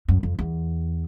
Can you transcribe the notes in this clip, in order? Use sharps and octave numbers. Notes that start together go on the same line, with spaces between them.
F#2
F2
E2